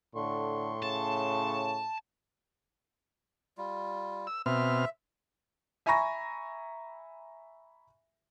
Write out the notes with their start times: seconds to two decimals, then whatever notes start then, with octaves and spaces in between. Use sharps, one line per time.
0.15 A2 D3 C6 C#6
0.83 C#3 A5
3.58 G3 F4
4.27 E6
4.46 B2 C4 E5 F6
5.86 E5 G#5 A#5 B5 C#6 A#6